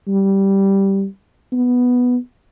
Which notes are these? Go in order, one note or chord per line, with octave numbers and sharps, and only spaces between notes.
G3
B3